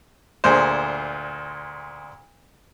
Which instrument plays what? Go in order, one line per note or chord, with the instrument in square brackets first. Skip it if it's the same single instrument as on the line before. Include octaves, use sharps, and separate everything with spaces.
[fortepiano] D2 A#2 G#4 C5